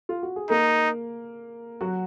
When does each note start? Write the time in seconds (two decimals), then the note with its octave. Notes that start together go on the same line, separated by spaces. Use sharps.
0.09 F4
0.23 F#4
0.36 G#4
0.50 A#3 D#4 A#4
1.81 F#3 F#4